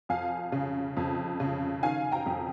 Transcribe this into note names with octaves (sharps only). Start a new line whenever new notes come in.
F2 F5 G#5
C#3
F2
C#3
D#3 F5 G#5
G5 A#5
F2